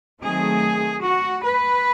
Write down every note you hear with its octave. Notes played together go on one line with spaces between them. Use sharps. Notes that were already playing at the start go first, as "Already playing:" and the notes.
D#3 F#3 A3 C4 G#4
F#4
B4